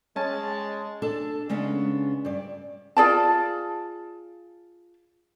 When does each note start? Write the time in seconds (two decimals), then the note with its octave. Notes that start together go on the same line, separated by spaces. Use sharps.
0.16 G#3 C#4 A5
1.02 D4 A4 A5
1.49 C#3 G#3 B3 C#4 D4
2.25 G2 D5
2.97 F4 G#4 D5 A5